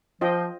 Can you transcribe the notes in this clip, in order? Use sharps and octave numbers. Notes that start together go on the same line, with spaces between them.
F3 F4 C5 D#5 G5